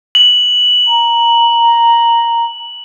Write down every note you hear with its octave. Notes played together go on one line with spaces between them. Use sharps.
F#7
A#5